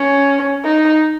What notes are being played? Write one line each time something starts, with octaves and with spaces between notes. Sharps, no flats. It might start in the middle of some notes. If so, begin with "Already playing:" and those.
Already playing: C#4
D#4